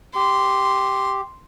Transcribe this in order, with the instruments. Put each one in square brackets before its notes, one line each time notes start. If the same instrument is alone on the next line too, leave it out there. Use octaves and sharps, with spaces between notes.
[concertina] G4 [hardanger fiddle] C6